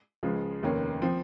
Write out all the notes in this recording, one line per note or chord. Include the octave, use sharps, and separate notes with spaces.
C#2 C#3 F3 G#3
F1 D#2 D#3 A#3 C#4
F3 C4